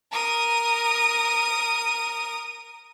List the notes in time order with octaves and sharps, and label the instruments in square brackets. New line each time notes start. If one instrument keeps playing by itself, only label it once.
[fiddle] A#4 D#6